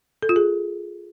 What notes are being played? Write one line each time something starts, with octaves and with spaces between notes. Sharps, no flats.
A4
F4
G#4